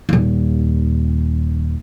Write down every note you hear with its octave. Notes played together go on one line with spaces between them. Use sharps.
D#1 D#2